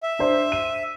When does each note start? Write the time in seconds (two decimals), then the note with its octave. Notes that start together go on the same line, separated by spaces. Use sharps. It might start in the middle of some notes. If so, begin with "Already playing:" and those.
0.03 E5
0.19 D4 C5
0.52 D#7